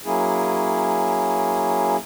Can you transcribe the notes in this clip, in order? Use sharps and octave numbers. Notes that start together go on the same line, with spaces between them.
F#3 A#3 C#4 E4 G#4